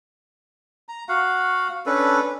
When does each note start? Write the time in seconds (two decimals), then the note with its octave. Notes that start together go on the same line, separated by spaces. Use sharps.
0.89 A#5
1.09 F#4 F5 F#5
1.86 C#4 D4 A4 B4